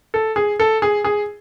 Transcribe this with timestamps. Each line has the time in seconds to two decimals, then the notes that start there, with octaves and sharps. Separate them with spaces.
0.14 A4
0.36 G#4
0.60 A4
0.82 G#4
1.04 G#4